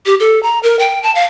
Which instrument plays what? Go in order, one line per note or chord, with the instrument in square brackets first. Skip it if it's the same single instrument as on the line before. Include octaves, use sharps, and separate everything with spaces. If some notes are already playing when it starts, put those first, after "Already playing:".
[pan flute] G4
A4
A#5
A#4
G5
A5
F5